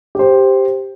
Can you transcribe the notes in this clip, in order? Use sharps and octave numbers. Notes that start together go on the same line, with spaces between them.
G4 C5